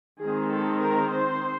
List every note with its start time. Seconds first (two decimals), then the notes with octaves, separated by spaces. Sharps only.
0.22 D#3 G#3 C4 D#4 G#4
0.52 A4
0.81 A#4
1.12 C5